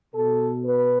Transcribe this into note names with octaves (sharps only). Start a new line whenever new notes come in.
B2 A4
B4